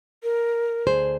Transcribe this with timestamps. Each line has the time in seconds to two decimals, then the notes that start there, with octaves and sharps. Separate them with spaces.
0.23 A#4
0.87 D2 G#4 C5